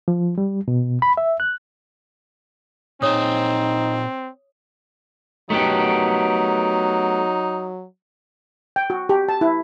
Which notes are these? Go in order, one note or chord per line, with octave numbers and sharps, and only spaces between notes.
F3
G3
B2
B5
E5
F#6
A#2 C4 D#4 G#4 C5 C#5 D6 D#6
F#3 A3 B3 D#4 G4
G5
F#4
G4
A5
E4